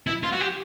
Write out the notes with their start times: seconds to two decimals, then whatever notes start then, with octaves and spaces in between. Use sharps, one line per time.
0.07 E4
0.23 F4
0.32 F#4
0.40 G4